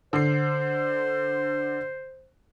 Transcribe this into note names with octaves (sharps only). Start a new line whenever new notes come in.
D3 C5 C7